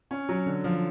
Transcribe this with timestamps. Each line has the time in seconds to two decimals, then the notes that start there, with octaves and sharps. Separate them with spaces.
0.11 C#4
0.29 F#3
0.46 D3
0.64 F3